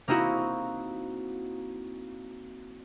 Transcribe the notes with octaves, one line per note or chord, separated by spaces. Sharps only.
A#3 C4 D#4 E4 F#4